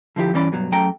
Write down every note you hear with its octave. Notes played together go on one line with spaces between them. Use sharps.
D3 F3 E4 G4
E2 G2 E3 C#4 D5 B5
G2 B2 F#3
F#2 A3 A4 G5 A#5